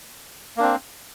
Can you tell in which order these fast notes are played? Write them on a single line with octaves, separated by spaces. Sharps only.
A#3 D4 C4